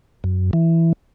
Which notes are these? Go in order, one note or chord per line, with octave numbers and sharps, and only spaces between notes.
F#2
E3